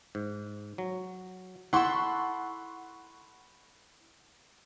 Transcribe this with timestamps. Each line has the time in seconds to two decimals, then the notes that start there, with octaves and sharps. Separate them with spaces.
0.15 G#2
0.78 F#3
1.73 E4 A4 F#5 C6 C#6